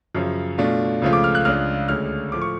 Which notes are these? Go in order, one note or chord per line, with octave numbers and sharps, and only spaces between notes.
F#2 C#3 F3
B2 A3 D4 F4
C#2 C#3 F3 A3 F4
D6
F6
F#6
C#2 C#3 G#3 D4 F4 F6
D2 D3 G#3 C#4 F6
A2 F3 A3 D6
C#6